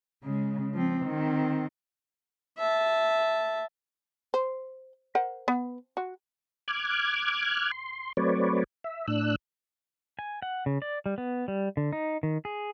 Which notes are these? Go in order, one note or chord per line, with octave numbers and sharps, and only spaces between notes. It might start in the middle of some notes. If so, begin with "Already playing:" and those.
C#3 G#3
F3 C4
D#3 C4
E5 A5
C5
A#4 C5 F#5
B3
F#4
D6 F6 F#6 G#6
C6
F#3 A3 C4 B4 C#5 D5
E5
A2 D4 E6 F#6
G#5
F#5
C#3
D5
G3
B3
G3
D3
D#4
D#3
G#4